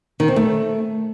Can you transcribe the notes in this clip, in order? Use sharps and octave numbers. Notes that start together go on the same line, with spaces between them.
D#3
C4
A3